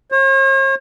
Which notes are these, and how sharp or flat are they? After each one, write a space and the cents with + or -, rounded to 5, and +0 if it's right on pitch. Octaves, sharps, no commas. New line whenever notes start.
C#5 -45